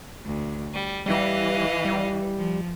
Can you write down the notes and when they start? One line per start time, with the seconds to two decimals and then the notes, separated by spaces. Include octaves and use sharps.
0.25 D2
0.73 G3
1.06 E3 G3 D#5 F5
1.85 G3
2.37 F3